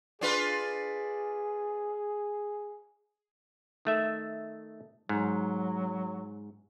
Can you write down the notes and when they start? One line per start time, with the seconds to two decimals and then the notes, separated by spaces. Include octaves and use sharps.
0.21 D4 F4 G#4 B4
3.85 D#3 A3 E5
5.09 G#2 F#3